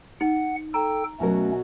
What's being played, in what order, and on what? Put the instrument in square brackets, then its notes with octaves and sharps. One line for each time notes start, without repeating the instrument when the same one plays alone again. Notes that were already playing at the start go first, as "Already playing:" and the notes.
[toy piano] D#4 [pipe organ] F#5
[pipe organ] A4 G5 [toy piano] A#5
[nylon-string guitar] B2 F#3 A#4 [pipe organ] A3 C#4